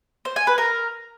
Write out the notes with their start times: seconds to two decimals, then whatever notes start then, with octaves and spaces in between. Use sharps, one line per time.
0.25 C5
0.36 G#5
0.47 B4
0.58 A#4